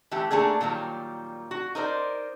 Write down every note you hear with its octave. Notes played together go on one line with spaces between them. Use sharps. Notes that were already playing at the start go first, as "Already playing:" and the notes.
E3 A3 G4
A3 A#3 D4 G#4
A#2 D#3 F#3 G3
F#4
D#4 A#4 C5 D5